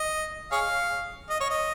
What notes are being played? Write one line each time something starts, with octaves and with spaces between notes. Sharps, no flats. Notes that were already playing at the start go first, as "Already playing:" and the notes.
Already playing: D#5
G#4 C#5 F5
D#5
C#5
D#5